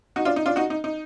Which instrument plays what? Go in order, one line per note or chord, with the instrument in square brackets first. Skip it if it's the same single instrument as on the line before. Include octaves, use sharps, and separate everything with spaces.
[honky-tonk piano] D#4 F#4
D4 F4
D#4
D4 F4
D#4 F#4
D#4
D#4